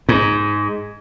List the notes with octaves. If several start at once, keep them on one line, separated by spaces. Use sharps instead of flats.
G#2